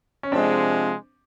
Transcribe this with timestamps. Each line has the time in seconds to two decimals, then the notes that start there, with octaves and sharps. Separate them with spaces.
0.23 C#4
0.31 C3 F3 G#3 C4 D4